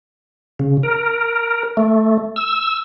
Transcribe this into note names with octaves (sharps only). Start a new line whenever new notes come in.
C#3
A#4
A3
E6